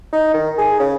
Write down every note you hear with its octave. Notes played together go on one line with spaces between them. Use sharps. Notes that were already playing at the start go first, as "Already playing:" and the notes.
D#4
D#3
G#4
C#3